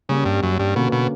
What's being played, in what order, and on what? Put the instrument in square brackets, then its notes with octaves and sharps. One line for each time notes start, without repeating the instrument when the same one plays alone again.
[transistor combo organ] C#3 [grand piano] G3 A#3 C#4
[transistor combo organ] G2
F#2
G2
[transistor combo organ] B2 [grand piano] D3 A#3 C#4 F#4 B4
[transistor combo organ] B2